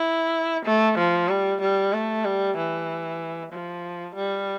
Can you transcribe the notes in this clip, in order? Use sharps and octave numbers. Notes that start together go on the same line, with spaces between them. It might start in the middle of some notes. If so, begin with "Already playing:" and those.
Already playing: E4
A3
F3
G3
G3
A3
G3
E3
F3
G3